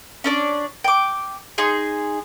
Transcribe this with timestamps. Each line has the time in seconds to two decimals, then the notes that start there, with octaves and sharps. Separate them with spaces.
0.24 C#4 D4 D5
0.84 G5 D6
1.58 D#4 G#4 C6